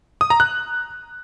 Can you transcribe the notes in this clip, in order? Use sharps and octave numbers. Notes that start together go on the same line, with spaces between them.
D#6
A#5
F#6